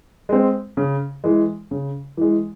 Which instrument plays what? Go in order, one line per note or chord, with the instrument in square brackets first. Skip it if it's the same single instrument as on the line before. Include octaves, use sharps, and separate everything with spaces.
[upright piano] G#3 C4
C#3
E3 G#3
C#3
E3 G#3